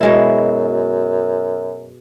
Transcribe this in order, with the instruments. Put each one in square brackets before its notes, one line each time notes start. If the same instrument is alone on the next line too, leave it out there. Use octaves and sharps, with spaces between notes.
[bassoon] F#2 [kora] B2 G#3 E4